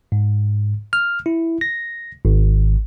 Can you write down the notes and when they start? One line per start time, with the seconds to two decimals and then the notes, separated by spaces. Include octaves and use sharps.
0.12 G#2
0.93 F6
1.26 E4
1.61 A#6
2.25 G#1